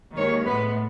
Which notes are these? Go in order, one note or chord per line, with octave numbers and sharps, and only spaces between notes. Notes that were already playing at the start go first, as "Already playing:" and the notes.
D#2 D#3 G#3 C#5
A2 G#3 B3 B4